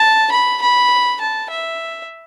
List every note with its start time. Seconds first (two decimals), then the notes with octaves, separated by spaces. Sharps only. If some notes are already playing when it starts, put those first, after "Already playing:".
Already playing: A5
0.31 B5
0.62 B5
1.21 A5
1.50 E5